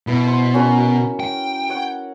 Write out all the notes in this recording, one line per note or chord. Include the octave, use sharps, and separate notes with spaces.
B2 E4 B4
C5
C#4 F#4 A#4
G5
C#5 F#5